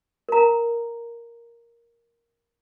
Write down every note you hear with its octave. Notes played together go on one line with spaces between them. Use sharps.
A#4 A#5